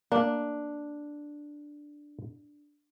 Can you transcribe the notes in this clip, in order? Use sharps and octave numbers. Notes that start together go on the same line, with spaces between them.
A#3 D4